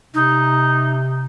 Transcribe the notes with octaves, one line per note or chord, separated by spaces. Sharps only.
C3 D#4